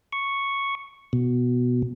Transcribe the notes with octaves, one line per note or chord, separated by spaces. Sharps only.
C#6
B2